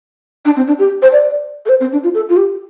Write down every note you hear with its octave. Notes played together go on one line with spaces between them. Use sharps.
D4
C4
D4
G4
C5
D5
A4
C5
C4
D4
F4
A4
F4
G4